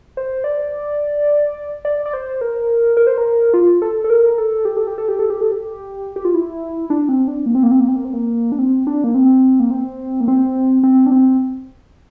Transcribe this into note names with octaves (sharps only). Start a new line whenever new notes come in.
C5
D5
D5
D5
C5
A#4
A#4
C5
A#4
F4
A4
A4
A#4
A4
G4
A4
G4
A4
G4
A4
G4
A4
G4
G4
F4
E4
D4
C4
D4
A#3
C4
A#3
C4
A#3
C4
A#3
C4
A#3
D4
C4
D4
A#3
C4
A#3
C4
A#3
C4
C4
D4
C4